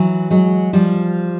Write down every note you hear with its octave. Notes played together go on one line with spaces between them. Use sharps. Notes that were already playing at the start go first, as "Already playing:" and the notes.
Already playing: E3 F#3
F#3 G#3
F3 G3